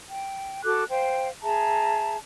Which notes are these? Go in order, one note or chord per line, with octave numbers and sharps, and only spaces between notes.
G5
F#4 A4 D6 F#6
C5 F5 G5
G#4 E5 A5 A#5